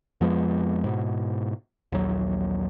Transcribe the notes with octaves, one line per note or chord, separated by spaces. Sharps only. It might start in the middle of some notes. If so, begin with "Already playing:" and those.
F2 F3 G#3 B3
G#2 B2
A#1 D#2 F#3